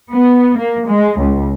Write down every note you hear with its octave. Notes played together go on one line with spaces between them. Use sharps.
B3
A#3
G#3
C#2